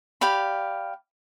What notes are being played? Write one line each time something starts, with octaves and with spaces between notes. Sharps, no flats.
G4 D5 F5 B5